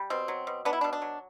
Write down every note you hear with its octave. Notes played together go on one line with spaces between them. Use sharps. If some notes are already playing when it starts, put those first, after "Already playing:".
Already playing: G3
B2 C4
F#3
B2
B3 D4
E4
D4
B2
D4
F#3